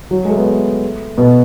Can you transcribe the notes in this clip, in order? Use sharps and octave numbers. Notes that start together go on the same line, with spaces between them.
F#3 F#4
G#3
A3
B3
A3
B2 B3